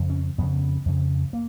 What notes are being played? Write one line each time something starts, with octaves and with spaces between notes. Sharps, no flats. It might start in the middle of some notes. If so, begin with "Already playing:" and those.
Already playing: F2 C#3
C#4
F2 C#3 B3
F2 C#3
A#3